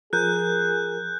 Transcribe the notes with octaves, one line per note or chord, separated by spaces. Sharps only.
F3 G#4 A#4 F#6 G6